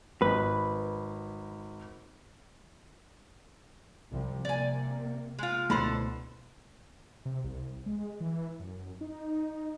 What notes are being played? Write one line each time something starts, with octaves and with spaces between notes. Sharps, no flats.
G#1 B4
C2 C3 F3
C3 A#3 D5 G#5
G#3 F4
C#2 B2 D3 A3 E4 A4 C5 B5
C3
C2
G#3
E3
F#2
F#2
D#4